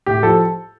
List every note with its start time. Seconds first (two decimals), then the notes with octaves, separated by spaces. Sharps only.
0.06 A2 G4
0.23 F3 A4